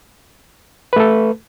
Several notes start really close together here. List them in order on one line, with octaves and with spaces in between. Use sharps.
B4 A3 A4